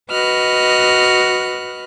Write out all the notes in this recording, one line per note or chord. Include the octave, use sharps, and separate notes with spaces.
F#4 B4 D#5 F6 F#6